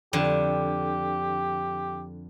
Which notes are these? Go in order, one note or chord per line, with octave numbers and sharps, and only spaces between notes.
F2 D3 G4